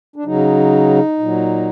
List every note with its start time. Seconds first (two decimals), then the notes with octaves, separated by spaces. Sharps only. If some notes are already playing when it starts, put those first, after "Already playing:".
0.16 D4
0.25 C#3 F#3 D#4
1.19 A#2 F#3